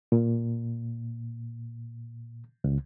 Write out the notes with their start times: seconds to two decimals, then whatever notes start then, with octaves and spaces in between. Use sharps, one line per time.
0.12 A#2
2.64 C#2